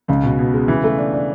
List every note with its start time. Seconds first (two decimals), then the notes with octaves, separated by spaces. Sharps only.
0.08 C#2 C#3
0.23 B2
0.39 B2
0.54 G#3
0.68 E3
0.84 A3
0.98 D4
1.13 D4